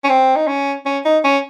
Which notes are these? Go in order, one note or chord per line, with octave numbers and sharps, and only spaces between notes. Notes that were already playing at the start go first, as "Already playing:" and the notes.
C#4
C4
D#4
C#4
C#4
D#4
C#4